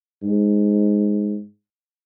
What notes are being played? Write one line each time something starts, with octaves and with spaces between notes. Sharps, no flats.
G#2